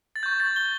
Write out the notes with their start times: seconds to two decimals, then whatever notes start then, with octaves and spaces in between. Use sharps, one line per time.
0.16 A6
0.23 C#6 G6
0.40 A6
0.56 G7